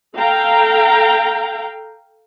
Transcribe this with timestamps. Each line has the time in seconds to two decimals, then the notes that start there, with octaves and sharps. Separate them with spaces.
0.16 A4 F5 G5 A#5